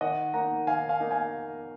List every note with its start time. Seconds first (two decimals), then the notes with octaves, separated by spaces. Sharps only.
0.01 D#3 D#5 F#5
0.34 A#3 D#4 F#5 A#5
0.67 D#3 F5 G#5
0.89 F5 G#5
1.00 A#3 D#4
1.11 F5 G#5